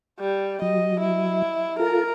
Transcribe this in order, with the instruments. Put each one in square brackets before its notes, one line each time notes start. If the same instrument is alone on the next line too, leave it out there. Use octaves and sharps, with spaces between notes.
[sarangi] G3
[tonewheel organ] F#3 [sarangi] D#5
[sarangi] E4
[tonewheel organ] F4 A4 [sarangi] A#4